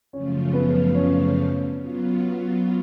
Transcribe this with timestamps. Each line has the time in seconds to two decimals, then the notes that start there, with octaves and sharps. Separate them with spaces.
0.13 F#2 C#3 F3 A3 C#4 F4
0.53 B3
0.95 C#4
1.77 F#3 B3 F4